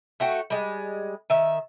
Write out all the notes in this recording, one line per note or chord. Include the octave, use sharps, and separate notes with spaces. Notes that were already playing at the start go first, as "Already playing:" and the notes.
A3 F#4 G5
G3 G#3
D#3 E5